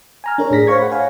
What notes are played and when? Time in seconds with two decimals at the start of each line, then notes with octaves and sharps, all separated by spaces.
0.24 G#5 A#5 F6
0.38 D4 A#4 C#5
0.51 A2 G#4 A#6 B6
0.67 C5 C#5 F5 C#6 G#6
0.79 F#5 B5
0.91 C#5 F5 F#5 G#5